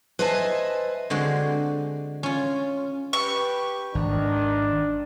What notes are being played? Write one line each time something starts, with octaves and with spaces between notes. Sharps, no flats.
B4 C5 D#5 E5 G#5 A5
D3 G#3 C4 F#4
C#4 F4
G4 B4 C#6
G#1 D#3 D4